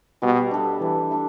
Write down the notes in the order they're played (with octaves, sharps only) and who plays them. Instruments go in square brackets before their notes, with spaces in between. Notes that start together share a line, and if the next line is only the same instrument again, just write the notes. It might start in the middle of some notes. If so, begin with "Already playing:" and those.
[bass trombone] B2 [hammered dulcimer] G3
[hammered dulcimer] D4 A4 E5
[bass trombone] E3 [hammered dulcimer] G3
[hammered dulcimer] D4 A4 E5